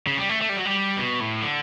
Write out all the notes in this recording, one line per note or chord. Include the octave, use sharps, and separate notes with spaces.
C#3
G3
A3
A3
G3
F#3
G3
B2
A2
D3